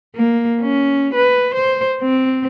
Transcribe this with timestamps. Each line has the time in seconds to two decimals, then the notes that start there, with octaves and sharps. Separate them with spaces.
0.15 A#3
0.61 C#4
1.14 B4
1.55 C5
2.01 C4